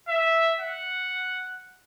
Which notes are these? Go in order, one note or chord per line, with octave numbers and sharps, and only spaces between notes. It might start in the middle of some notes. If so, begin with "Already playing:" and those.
E5
F#5